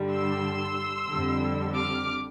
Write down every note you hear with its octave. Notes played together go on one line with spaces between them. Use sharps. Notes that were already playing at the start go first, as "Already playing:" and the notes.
Already playing: G2 D3 G3
C6 E6
F2 D3 G3
D6 F6